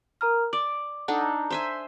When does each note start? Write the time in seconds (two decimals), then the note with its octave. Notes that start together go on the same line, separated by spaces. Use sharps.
0.21 A#4 A#5 F6
0.53 D5 D6
1.08 D4 D#4 A4 F#5
1.21 A#5
1.50 C5 E5 G#5